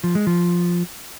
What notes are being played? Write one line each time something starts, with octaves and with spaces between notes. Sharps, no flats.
F3
G#3
F3